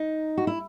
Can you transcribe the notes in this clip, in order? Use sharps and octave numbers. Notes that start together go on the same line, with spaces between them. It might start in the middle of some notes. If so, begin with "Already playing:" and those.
Already playing: D#4
F#4
E4